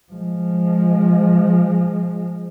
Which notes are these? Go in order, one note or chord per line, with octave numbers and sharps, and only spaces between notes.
F3 G#3